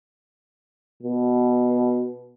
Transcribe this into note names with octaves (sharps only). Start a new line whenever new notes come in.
B2